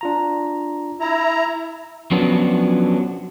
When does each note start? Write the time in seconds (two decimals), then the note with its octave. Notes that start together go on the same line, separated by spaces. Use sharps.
0.01 D4 F4 A#5
1.00 E4 A#5
2.11 F3 F#3 B3 C#4 D4